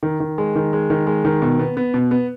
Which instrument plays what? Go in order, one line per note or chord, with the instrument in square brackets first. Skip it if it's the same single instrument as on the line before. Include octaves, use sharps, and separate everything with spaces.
[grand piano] D#3
D#3
G#3
D#3
G#3
D#3
G#3
D#3
B2
B3
B3
B2
B3